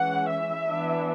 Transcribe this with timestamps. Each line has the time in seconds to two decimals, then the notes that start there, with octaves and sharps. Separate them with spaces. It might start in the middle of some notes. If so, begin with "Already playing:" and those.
Already playing: E3 G#3 C#4 F#5
0.29 E5
0.68 E3 B3 D4